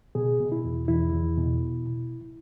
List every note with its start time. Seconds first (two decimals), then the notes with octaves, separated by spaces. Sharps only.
0.15 B2 G#4
0.40 B2
0.52 E4
0.65 E2
0.88 E2 E4
1.13 E2
1.37 B2